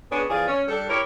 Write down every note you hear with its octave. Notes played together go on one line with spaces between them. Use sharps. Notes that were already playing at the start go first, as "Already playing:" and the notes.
B3 C#4 D4 G#4
E2 F3 G#4 D5 F5
C#4
G3 D4 A4
E4 G4 A#4 C#5